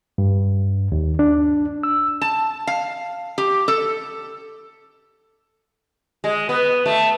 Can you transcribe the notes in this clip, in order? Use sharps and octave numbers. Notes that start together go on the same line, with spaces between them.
G2
D#2
D4
E6
A5
F5
G4
A4
G#3
B3
A3